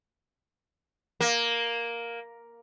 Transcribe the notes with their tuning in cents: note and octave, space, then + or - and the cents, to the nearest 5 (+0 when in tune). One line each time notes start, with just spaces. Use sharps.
A#3 +5